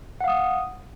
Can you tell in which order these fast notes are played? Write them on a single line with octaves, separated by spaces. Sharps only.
F#5 F5 D#6